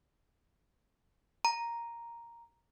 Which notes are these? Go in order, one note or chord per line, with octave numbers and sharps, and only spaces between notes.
A#5